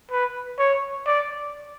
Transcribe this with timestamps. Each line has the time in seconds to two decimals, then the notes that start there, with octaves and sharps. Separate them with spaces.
0.11 B4
0.59 C#5
1.06 D5